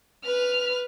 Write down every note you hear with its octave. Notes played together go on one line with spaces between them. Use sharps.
B4 F6